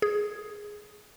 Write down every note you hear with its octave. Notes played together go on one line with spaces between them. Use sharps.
G#4